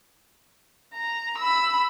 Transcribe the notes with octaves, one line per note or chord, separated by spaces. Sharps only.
A#5
B5 E6